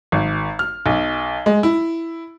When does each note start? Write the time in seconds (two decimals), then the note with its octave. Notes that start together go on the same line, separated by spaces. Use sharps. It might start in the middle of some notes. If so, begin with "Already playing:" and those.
0.12 G#1
0.59 F6
0.86 B1
1.46 G#3
1.63 E4